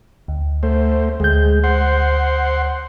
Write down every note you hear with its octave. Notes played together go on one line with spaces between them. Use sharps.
D2
A3 C5
D2 G#3 G6
C5 F#5 C6